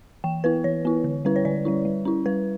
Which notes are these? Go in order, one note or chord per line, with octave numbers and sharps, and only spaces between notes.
E3 G5
B3 E4 B4
E3 C#5
B3 E4
D3
G3 C#4 E4 B4
C#5
D3 D5
G3 C#4 E4
G3
C#4 E4
G3 B4